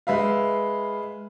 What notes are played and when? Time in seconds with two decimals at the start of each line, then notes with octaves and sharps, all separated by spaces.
0.07 G#3 B4 E5 F5